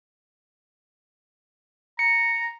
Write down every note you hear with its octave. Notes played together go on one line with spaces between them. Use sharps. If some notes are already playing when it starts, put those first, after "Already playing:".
A#5 C#7